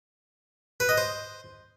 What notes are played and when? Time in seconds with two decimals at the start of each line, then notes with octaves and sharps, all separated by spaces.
0.80 B4
0.89 D#5
0.98 C5